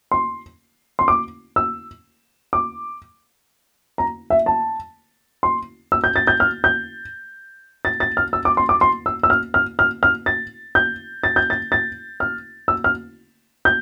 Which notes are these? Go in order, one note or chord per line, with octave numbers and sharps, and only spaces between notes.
C6
C6
D6
E6
D6
A#5
E5
A5
C6
E6
G6
A6
G6
F6
G6
A6
A6
F6
E6
D6
C6
D6
C6
E6
E6
F6
F6
F6
F6
A6
G6
A6
G6
A6
A6
F6
E6
F6
G6